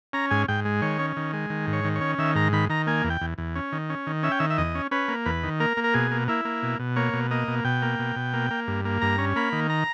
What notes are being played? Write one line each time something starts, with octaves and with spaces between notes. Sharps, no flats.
C#4 A#5
G#2 G#5
G#2 G5
G#3
D#3 C#5
C#4
D#3
G#3
D#3
G#2
C#5
D#3
C#5
C#4
D#3 E5
G#2 A#5
D#3 B5
D#3 A#5
A#3 G#5
E2
G5
E2
E2
C#4
D#3
C#4
D#3
C#4 E5
G5
D#3 E5
E5
E2 D#5
C#4
C#4 B4
A#3
E2 B4
D#3
A#3 A#4
A#3
A#4
B2 G#4
A#3
A#3 E4
A#3
B2
B2
A#3 C#5
B2
A#3 D#5
B2
B2 G5
A#3
B2
B2
A#3
A#3
G2
A#3
G2 A#5
C#4
A#3 B5
D#3
A#5